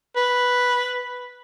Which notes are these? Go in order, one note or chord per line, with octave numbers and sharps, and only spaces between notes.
B4